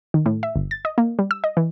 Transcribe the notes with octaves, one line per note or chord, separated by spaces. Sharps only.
D#3
A2
E5
G1
A6
D#5
A#3
G3
E6
D#5
E3